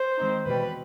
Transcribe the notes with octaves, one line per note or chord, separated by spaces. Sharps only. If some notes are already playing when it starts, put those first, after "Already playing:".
Already playing: C5
D#3 G#3 C4 D#4
E2 B2 G3 B4